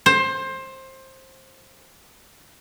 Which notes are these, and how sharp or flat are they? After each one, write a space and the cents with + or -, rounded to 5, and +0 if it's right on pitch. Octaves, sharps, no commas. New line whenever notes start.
C5 +20